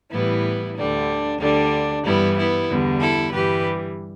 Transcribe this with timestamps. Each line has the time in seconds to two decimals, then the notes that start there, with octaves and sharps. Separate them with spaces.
0.10 A2 E3 G3 B3 E4
0.75 D2 D3 G3 D4
1.39 D2 D3 G3 D4
2.03 G2 E3 G3 B3 E4
2.36 B3 E4
2.68 E2 D3 G3
3.00 E4 A4
3.33 G2 E3 G3 G4 B4